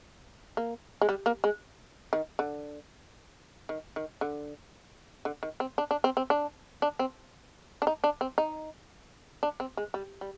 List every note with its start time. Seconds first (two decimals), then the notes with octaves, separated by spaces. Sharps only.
0.57 A#3
1.01 G#3
1.09 G3
1.26 A#3
1.44 G#3
2.13 D#3
2.39 D3
3.69 D#3
3.96 D#3
4.21 D3
5.25 D3
5.43 D#3
5.60 C4
5.78 D4
5.91 D4
6.04 C4
6.17 C4
6.30 D4
6.82 D4
6.99 C4
7.82 D4
7.87 D#4
8.04 D4
8.21 C4
8.38 D#4
9.43 D4
9.60 C4
9.77 G#3
9.94 G3
10.21 G3